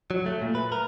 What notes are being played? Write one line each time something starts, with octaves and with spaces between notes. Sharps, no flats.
F#3
A3
A#2
B4
A#4